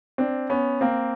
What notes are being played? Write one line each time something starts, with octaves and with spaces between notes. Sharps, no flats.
C4 D4
B3 C#4
A#3 C4